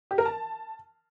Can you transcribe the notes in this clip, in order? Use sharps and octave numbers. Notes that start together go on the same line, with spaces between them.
G4
A#4
A5